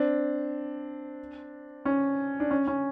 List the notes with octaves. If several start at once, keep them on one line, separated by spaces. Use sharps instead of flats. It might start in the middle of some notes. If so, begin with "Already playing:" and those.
Already playing: C4 D4
C#4
D4
C#4
C#4